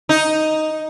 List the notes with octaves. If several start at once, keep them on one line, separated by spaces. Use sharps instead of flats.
D#4